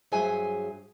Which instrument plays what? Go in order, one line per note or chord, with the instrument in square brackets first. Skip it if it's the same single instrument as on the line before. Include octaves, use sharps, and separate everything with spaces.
[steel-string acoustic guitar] G2 F#3 G#4 C5 E5 G#5